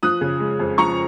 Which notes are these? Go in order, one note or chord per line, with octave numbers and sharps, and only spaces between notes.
F3 D#6 F#6
C#3
G#3
F2
F3 A#5 C#6